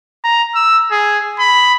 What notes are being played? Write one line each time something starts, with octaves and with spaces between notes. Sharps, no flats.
A#5
E6
G#4
B5